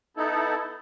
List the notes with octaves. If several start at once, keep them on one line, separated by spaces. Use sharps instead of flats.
B3 D#4 E4 A4